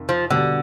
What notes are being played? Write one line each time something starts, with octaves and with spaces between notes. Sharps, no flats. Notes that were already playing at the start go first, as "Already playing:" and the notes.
Already playing: F2 C3 D#3
F3
B2 D3 G3 D4